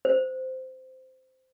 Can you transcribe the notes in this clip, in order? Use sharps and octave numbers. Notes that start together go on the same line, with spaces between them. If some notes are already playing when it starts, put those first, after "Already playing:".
C5